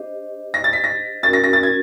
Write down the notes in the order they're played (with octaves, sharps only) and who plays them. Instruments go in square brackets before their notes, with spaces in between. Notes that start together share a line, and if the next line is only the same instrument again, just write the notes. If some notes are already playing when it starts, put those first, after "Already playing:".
Already playing: [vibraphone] D4 G4 C5 D#5
[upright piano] A#6
A6
B6
A#6
[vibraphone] C#4 F#4 A#4 [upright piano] A6
[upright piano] A#6
A#6
A6
G#6